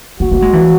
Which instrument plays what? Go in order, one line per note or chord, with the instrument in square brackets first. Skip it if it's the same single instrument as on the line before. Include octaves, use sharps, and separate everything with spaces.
[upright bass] A#3 [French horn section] F#4
[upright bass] A#3
G#3
E3